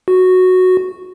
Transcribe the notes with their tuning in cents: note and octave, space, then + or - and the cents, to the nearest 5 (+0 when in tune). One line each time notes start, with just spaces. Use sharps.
F#4 -5